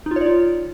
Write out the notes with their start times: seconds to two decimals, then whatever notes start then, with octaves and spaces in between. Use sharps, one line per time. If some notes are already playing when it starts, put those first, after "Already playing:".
0.06 D#4
0.11 F4
0.16 C#5
0.21 D5
0.26 F4